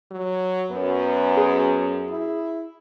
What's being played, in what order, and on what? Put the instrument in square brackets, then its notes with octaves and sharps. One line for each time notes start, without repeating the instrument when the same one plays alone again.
[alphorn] F#3
[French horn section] F#2 [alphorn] B3
[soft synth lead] G#4
[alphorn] E4